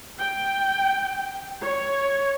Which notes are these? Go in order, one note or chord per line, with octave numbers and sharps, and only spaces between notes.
G5
C#5